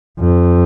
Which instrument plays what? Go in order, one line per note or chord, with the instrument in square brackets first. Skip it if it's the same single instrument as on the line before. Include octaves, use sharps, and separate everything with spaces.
[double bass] F2